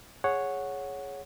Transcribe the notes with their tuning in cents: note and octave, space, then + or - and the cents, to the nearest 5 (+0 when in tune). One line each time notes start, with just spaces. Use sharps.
G#4 +0 C#5 +0 F#5 -5